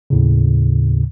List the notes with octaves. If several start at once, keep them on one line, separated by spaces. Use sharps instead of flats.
D#2 A2 C#3